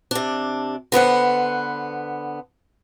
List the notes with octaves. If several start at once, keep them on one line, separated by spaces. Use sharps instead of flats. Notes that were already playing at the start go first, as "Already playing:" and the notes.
C3 D4
D3 B3 C5 F#5